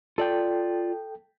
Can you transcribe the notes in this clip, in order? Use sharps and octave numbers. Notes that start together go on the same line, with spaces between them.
F4 A4 D5 G5